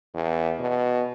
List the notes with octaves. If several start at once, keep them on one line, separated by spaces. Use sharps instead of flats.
E2
B2